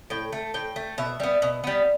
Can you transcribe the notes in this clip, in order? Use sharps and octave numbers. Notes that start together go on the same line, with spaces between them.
A2 G5
A3
A2 G5
A3
B2 E5
G3 B3
B2
G3 B3